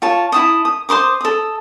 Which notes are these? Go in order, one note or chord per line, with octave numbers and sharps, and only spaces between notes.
F4 C#5 A5
E4 A5 D#6
D#6
C5 C6 D6 D#6
A4 D#6